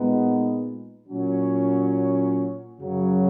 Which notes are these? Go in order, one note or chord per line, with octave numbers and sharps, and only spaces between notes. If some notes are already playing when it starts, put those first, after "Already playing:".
Already playing: A#2 G#3 B3 D#4
A#2 F#3 C#4
F#2 C#3 F#3